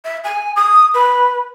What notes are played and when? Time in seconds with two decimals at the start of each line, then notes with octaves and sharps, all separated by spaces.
0.05 E5
0.24 G#5
0.56 D#6
0.94 B4